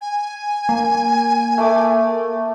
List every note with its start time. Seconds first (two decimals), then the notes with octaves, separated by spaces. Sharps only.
0.01 G#5
0.69 A#3
1.58 A3 D6